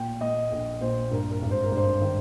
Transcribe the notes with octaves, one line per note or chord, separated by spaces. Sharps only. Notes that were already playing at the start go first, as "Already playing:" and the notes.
Already playing: A#2 G5
A#2 D#5
A#1
A#2 C5
G2 A#4
A#4
G#1
C5
A#4
G2
C5
D#3